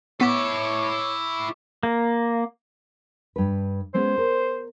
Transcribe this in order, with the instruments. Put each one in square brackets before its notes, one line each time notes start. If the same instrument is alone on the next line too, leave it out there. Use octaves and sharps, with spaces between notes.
[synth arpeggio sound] B3 B6 [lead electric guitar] E4 A4 [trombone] C#5 [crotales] C#6 D6
[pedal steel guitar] A#3
[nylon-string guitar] G2 B4
[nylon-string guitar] G#3 B3 C#4 [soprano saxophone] C5
[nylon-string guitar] A#4